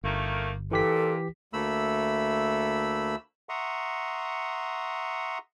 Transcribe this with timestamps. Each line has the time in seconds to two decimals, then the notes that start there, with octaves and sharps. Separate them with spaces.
0.04 G1 D#3 A3 A#3
0.71 A#2 E3 G4 A4 B6
1.53 D2 A3 A#3 B5 E6
3.49 E5 F#5 A#5 C6 C#6 D#6